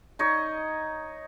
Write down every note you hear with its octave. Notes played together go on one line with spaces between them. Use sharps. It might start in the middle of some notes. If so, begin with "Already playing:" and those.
D#4 C#5 D#5